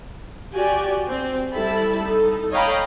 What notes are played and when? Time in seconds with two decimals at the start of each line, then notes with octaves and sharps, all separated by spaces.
0.54 F#4 G4 D5 G#5
1.07 C4
1.53 G3 E4 A4 A5 B5
2.03 D#4 A4
2.51 C#5 D#5 F5 G5 A#5 B5